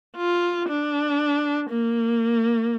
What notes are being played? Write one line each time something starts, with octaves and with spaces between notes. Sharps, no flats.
F4
D4
A#3